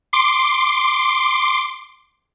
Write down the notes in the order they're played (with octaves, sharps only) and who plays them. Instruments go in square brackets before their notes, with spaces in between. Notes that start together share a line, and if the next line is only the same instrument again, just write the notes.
[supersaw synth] C6 D6